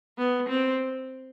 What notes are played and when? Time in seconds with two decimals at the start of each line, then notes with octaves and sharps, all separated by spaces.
0.18 B3
0.49 C4